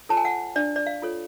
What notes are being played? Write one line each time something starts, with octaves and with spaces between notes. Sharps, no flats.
F4 A4 C#5 A5
G#5
F#5
D4 D5
D5
F5
F4 A4 C#5